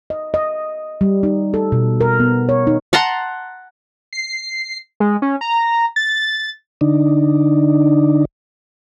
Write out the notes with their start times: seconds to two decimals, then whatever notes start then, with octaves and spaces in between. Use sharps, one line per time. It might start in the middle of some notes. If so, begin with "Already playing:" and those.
0.10 D#5
0.34 D#5
1.01 G3
1.23 D#4
1.54 A4
1.72 B2
2.01 A#4
2.20 B3
2.49 C#5
2.67 D#4
2.93 F#5 A5 A#5 C6
4.13 C7
5.00 G#3
5.22 C#4
5.41 A#5
5.96 A6
6.81 D3 D4 D#4